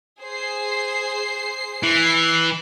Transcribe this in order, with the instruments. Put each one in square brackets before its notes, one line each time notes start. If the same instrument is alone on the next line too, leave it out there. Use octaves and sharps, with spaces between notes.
[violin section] G#4 C5 C7
[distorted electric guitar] E3 [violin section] C7